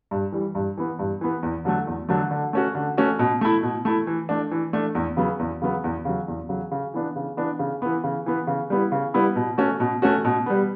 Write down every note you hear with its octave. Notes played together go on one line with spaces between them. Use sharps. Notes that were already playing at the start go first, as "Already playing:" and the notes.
G2
E3 G3
G2
E3 B3
G2
E3 B3
E2
D3 F#3 A3
E2
D3 F#3 A3
D3
A3 C#4 F#4
D3
A3 C#4 F#4
B2
A3 E4
B2
A3 E4
E3
A3 D4
E3
A3 D4
E2
C#3 F#3 B3
E2
C#3 F#3 B3
E2
C#3 F#3
E2
C#3 F#3
C#3
E3 B3 D4
C#3
E3 B3 D4
C#3
E3 B3
C#3
E3 B3
C#3
G3 B3 E4
C#3
G3 B3 E4
B2
A3 C#4 F#4
B2
A3 C#4 F#4
B2
G3 B3